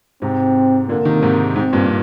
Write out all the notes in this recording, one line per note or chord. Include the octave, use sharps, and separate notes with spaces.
G#2 C3 C4
A#2 D3 A#3
C3 D#3
G#2 C3
G#2 C4
G2 A#2